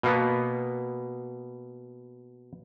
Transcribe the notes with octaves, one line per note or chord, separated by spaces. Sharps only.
B2 A#3 B3